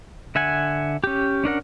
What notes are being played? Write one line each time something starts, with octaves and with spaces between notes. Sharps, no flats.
D3 E5 F#5 G#5
C#4 G4
C#4 D4 A#4 F#5